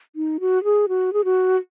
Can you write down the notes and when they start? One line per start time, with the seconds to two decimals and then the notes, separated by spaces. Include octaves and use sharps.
0.16 D#4
0.40 F#4
0.64 G#4
0.89 F#4
1.13 G#4
1.24 F#4